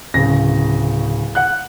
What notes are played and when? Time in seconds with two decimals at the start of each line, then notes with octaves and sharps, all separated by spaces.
0.14 D1 C#3 A#6
1.35 F#5 F#6